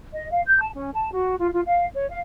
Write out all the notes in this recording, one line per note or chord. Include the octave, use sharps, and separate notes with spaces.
D#5
F5
G6
A5
C#4
A5
F#4
F4
F4
F5
C#5
F5